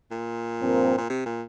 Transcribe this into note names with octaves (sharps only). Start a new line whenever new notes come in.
A#2
G2 F3 C4 A#4
A#2
C3
A#2